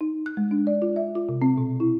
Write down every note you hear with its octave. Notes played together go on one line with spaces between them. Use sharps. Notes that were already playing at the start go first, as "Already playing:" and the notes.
D#4
F#6
G#3
D4
D5
F4
E5
F4
C3
C4
B2
E4